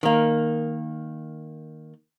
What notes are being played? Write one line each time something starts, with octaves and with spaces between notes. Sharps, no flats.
D#3 A#3